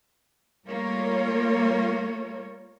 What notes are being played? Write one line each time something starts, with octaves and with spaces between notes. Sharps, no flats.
G3 A3 A#3 F4 A#4 C#5